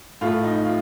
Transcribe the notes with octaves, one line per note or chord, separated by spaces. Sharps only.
A2 A3 F4
D#4
F4